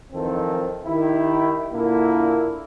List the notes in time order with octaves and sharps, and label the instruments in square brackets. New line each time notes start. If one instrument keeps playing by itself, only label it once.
[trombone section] F2 D#3 E3 C4 F4 A4
D#3 E4 G4
A#2 D3 A#3 D4 E4